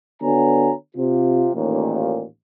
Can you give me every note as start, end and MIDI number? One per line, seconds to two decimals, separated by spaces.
0.22 0.72 50
0.22 0.72 59
0.22 0.72 66
0.22 0.72 73
0.22 0.72 80
0.22 0.72 82
0.97 1.50 48
0.97 1.50 65
1.55 2.25 33
1.55 2.25 39
1.55 2.25 46